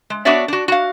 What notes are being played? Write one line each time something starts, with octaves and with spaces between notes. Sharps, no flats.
G#3
B3 D4 F#4 C#5 D5 E5
D4 F#4
F#4 F5